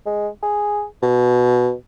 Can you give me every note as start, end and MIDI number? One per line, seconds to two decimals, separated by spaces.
0.06 0.28 56
0.43 0.85 68
1.02 1.74 47